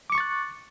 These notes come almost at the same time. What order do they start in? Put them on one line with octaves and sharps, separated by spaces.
D6 C#7 C#6 A6 F#6